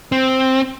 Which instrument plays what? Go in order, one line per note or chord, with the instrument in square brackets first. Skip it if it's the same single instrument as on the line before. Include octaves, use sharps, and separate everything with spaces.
[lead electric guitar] C4